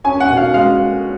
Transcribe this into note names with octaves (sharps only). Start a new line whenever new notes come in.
C#4 G#5
F#5
B2
F5
G#3 F5